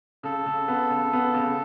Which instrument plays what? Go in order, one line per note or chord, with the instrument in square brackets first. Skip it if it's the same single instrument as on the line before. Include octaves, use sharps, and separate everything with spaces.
[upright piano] C#3 [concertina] A4
[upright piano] C#3
B3
C#3
B3
C#3